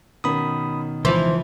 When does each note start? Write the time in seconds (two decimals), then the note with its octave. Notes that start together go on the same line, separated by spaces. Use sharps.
0.24 B2 D#3 C#4 B5 D#6
1.05 C#2 E3 F3 C5 C6